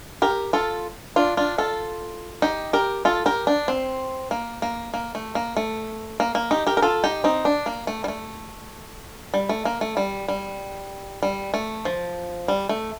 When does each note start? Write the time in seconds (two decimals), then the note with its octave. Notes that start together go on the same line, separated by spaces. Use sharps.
0.22 G4 A#4
0.53 F4 A4
1.16 D4 F4
1.37 D4 F4
1.58 F4 A4
2.42 D#4 G4
2.73 G4 A#4
3.05 F4 A4
3.26 G4 A#4
3.47 D4
3.68 C4
4.31 A#3
4.62 A#3
4.94 A#3
5.15 A3
5.35 A#3
5.57 A3
6.20 A#3
6.35 A#3
6.51 D#4 G4
6.67 G4 A#4
6.77 A#4
6.82 F4 A4
7.04 D#4 G4
7.24 C4 D#4
7.45 D4
7.66 A#3
7.87 A3
8.04 G3
8.08 A3
9.34 G3
9.49 A3
9.65 A#3
9.81 A3
9.97 G3
10.28 G3
11.23 G3
11.54 A3
11.85 F3
12.48 G3
12.69 A3